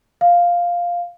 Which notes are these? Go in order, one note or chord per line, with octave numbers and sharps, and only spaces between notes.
F5